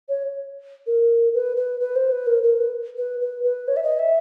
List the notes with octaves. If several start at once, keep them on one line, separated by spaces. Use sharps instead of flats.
C#5
A#4
B4
B4
B4
C5
B4
A#4
A#4
B4
B4
B4
B4
C#5
E5
D#5
E5